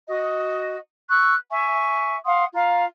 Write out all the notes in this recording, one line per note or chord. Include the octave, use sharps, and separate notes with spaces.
F#4 D#5
C#6 E6 F#6
E5 G#5 C#6
F5 F#5 C6 D#6
F4 F5 A#5